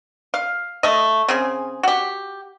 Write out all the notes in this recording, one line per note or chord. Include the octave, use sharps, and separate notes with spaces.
F5
A3 D#5
C#3 C4 G#4
F#4 G4